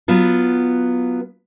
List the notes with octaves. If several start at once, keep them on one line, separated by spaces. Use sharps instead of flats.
F#3 B3 F4